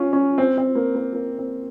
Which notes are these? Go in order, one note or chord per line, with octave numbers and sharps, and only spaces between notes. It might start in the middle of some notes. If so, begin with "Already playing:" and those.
Already playing: C#4 F4
C#4
C4
C4
A#3
A#3
A#3
C4